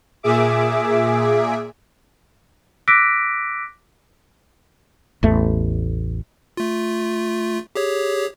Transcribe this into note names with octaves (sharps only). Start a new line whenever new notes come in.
A#2 G#4 E5 D6
D6 E6 F#6 A#6 B6 D7
A1 E2 A3
A3 F4
G4 G#4 C#5